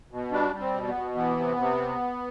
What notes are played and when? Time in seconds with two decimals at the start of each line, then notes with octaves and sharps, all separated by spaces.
0.11 B2
0.32 G3 D4
0.53 G3
0.60 C4
0.74 B2
0.88 B3
0.95 B2
1.15 E3 B3
1.37 C3
1.56 C3